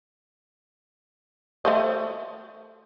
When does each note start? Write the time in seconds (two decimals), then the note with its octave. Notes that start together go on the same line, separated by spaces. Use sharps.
1.65 A3 C5 D#5